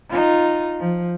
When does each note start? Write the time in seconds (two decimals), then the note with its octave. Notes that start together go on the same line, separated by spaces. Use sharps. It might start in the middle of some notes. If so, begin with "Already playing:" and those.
0.10 D#4 F4
0.80 F3